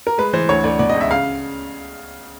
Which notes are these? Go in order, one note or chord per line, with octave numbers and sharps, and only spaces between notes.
A#4
G#3 B4
E3 C5
D2 C#5
D2 D5
B2 D5
C#2 D#5
E5
C#3 F5